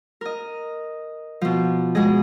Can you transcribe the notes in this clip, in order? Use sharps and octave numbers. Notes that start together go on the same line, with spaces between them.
A#4 D#5
B2 F3
B2 G#3 G#4 D#5